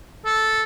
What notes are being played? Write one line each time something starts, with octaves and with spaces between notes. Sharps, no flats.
A4